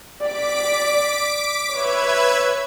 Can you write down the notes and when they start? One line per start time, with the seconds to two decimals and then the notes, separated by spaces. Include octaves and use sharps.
0.21 D5 D6 B6 D7
1.73 B4 C#5 E5 G#6